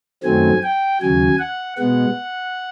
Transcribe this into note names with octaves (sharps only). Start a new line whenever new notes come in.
F#2 D#3 F#3 A3 C4 G#5
G5
D#2 C#3 F#3 G#5
F#5
B2 G#3 B3 F#5